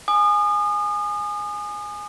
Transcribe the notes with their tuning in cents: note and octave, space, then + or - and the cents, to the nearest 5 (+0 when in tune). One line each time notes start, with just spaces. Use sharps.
G#5 +0 D#6 -35